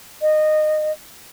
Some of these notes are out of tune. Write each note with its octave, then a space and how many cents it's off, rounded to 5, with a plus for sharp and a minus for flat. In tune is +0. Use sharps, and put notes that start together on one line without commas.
D#5 -20